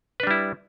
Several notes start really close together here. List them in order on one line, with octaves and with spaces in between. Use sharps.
B4 D4 G3 E4